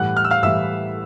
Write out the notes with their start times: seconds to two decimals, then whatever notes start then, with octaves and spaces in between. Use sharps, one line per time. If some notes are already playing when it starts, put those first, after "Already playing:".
Already playing: A2 E3 G3 F#5 F#6
0.17 F6
0.25 E6
0.31 F5 F6
0.43 A2 E3 G3 E5 E6